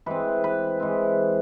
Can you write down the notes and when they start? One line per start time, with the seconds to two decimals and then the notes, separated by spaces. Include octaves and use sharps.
0.06 E3 G#3 C4 B4
0.44 B4
0.80 E3 G#3 C4